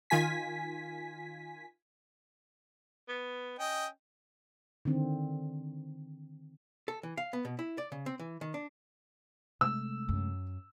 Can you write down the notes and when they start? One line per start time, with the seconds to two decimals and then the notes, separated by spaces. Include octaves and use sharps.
0.10 D#3 F4 G#5 B6
3.08 B3
3.59 C#4 D#5 G5
4.85 D3 D#3 C4
6.88 A4
7.03 E3
7.17 F5
7.33 B3
7.45 B2
7.59 E4
7.78 D5
7.92 C#3
8.06 C4
8.19 E3
8.41 D#3
8.54 D4
9.61 C3 G#3 A3 E6
10.09 F#2